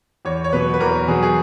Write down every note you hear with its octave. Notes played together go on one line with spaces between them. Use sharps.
E2 C#5
C#5
B2 F#3 B4
B4
E2 A#4
B2 F#3 G#4
G#4